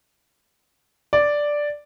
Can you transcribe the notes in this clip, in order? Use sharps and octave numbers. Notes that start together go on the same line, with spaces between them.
D5